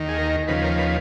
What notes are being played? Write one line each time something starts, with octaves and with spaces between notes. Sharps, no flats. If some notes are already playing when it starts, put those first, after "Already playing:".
Already playing: D#2 D#3
G#4
A#4
D#2 C#3 F3 B4
A#4
B4